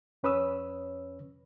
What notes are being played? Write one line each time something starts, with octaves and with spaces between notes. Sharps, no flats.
F2 C#4 B4 C#5 D#6 E6